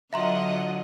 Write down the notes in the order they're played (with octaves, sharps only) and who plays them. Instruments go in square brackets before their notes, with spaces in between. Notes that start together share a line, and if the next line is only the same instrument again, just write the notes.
[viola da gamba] D3 F#3 [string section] F4 D#5 F#5 [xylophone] E5 A#5 C6